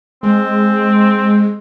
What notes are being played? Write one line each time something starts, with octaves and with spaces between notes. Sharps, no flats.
G#3 C4